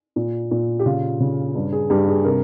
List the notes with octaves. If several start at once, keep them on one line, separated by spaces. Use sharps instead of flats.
A#2
A#2
G4
C#3 F4
C#3
G2
G#4
G2 G4
G#4
C3 A#4